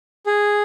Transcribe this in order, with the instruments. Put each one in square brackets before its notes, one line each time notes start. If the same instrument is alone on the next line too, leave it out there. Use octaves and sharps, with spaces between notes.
[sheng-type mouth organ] G#4